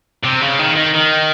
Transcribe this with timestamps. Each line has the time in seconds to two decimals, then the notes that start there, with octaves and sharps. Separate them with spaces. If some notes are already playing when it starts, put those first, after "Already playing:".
0.24 C3
0.42 C#3
0.59 D#3
0.76 D#3
0.95 D#3